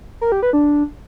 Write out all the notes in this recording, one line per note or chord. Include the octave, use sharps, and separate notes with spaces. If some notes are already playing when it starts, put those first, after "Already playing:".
A#4
G4
B4
D4